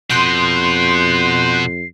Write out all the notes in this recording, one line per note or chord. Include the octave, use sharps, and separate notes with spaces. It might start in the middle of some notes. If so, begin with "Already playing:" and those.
F2 B2 C6 F#6 G6 C7